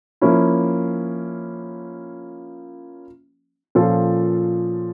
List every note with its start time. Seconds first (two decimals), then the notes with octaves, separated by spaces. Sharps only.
0.21 F3 A#3 C#4 E4
3.75 A#2 F3 C#4 F4 A4